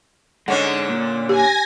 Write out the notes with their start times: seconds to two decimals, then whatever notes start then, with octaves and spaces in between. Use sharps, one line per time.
0.48 D3 G#3 C#4 D#4 F#5
0.89 A#2
1.29 G4 G#5 A#6